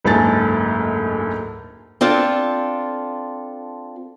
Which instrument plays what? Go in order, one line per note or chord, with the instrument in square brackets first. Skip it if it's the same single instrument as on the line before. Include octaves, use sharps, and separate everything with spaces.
[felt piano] F#1 D2 G#2 A3 G#5 A6
[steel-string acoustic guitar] C4 D4 F4 A4